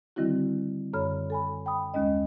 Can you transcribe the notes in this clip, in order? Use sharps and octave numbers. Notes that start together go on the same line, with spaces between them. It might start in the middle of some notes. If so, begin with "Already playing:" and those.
D3 D#3 G3 C4 E4 F#4
F#2 D3 A4 C#5 B5 F6
A4 G#5 B5
G5 B5 D#6
D#2 G#3 C#4 D#5